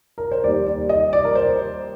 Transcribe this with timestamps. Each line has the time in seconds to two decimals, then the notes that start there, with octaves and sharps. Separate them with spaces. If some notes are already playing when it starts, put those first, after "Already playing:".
0.18 A#4
0.31 C5
0.44 D#2 D#3 G3 D5
0.66 D5
0.89 D#5
1.13 D5
1.25 A#4
1.35 C5